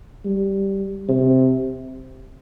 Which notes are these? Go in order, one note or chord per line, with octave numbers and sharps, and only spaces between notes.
G3
C3